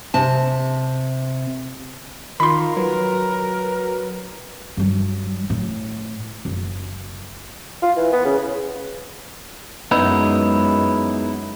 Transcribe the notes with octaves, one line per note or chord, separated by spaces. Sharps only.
C3 A5
D#3 F4 A#4 B5 C6
F#3 B4
G2 F#3
A2
F#1
F4
E3
B3
C#3
F#2 G#3 B3 D#4 E4